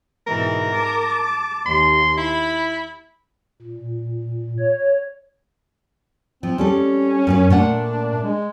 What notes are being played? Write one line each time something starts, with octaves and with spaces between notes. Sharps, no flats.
G#2 B2 E3 A#4
A5 D6
D#2 C6
E4 B5
A#2
C#5
F3 C4
G3 C4 C#4 A4
F#2 F#4 B4
A#2 A3 D4 F#5
G#3